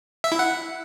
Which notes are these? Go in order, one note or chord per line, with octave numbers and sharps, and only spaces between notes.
E5
E4
F#5